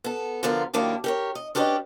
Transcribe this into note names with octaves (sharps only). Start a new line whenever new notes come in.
B3 A4
D3 F3 B3 F4 A#4
F#2 D#3 A#3 D4 E4 G4
G4 A#4 C#5
D#5
C#4 D4 G4 B4 C5 D#5